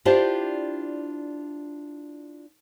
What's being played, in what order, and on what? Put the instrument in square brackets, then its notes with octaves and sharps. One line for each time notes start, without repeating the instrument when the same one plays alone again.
[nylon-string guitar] D4 E4 F4 G4 C5 D5